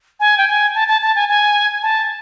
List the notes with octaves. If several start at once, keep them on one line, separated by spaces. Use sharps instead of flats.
G#5
G5
G#5
A5
A5
A5
G#5
G#5
A5